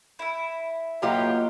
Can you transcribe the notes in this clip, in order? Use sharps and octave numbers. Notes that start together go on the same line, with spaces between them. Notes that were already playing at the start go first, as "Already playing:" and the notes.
E4 E5
A2 F#3 A#3 B3 D#4 F4 G4